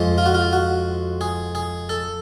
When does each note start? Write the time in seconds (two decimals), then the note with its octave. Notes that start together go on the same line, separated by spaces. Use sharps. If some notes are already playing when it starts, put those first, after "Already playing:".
Already playing: F2 F3 G#3
0.18 F4
0.26 F#4
0.34 F4
0.53 F#4
1.21 G#4
1.55 G#4
1.89 A4